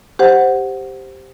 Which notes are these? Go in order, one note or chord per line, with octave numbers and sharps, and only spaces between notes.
G4 C5 F#5